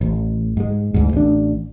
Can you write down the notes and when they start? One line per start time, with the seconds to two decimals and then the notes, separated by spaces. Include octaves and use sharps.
0.01 A1
0.57 G#2 G#3
0.94 D2 G#2
1.13 A1 D4